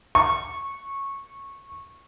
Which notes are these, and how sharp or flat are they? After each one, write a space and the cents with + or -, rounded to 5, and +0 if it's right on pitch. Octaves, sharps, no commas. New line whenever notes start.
C#6 -15